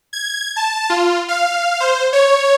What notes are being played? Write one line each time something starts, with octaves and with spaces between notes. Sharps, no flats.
G#6
A5
F4
F5
C5
C#5